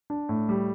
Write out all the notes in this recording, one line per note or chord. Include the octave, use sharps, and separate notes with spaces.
D4
A2
G3